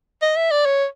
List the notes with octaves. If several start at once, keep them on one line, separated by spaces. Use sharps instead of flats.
D#5
E5
D5
C#5